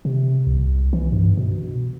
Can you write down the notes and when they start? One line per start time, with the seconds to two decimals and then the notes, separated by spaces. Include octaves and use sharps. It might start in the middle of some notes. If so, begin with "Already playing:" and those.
0.05 C3
0.47 C2
0.93 E3
1.12 G2
1.37 B2